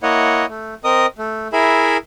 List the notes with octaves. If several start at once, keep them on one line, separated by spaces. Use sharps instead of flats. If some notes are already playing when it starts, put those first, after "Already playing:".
A#3 E4 C#5 D#5 F#5
A3
C4 A#4 D#5 D#6
A3
E4 G#4 A#4 E5 B5